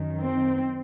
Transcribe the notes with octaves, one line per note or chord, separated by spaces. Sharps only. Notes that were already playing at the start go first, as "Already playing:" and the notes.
Already playing: F#2 D#3
C4